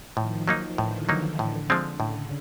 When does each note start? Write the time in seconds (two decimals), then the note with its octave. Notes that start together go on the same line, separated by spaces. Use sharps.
0.17 A2 D#3 F3
0.48 F#3 A#3 D#4
0.78 A2 D3 E3
1.09 F#3 A#3 D#4
1.39 A2 D3
1.70 F3 G#3 C4
2.00 A2 C#3